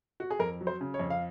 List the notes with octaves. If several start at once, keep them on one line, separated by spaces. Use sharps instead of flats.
F#4
G#4
F2 A#4
F#3
C5
C#3
C#5
F2
F5